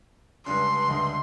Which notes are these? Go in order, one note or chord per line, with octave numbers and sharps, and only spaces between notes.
C#2 G2 D3 C6
D2 D#5